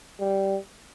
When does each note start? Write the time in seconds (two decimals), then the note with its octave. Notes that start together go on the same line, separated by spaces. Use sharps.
0.20 G3